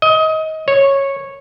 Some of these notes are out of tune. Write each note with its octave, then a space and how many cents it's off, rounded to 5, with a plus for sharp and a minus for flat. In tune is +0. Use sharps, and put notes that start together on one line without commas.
D#5 +25
C#5 -10